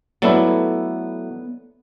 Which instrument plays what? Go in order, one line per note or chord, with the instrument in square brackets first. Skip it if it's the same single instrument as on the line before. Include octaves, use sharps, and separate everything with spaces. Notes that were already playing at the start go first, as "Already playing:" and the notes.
[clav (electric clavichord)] F#3 A3 E4 [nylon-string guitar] B3 A4 D5